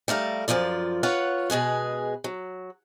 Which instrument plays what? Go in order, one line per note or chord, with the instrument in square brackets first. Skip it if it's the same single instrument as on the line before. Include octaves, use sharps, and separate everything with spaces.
[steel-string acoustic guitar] G3 A3 A#4 F5
F#2 E3 F3 F4 D5
F4 B4 C#5 F#5
B2 G#3 G#4 B4
F#3